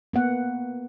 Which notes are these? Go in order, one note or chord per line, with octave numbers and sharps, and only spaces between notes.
A#3 B3 F#5